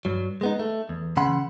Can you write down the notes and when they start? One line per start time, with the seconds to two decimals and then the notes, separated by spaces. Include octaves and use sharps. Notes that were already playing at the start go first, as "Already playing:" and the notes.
0.05 G2 F#3
0.41 G#3 B3 D#4
0.59 A3
0.89 E2
1.17 D2 C#3 E3 F#5 B5 C6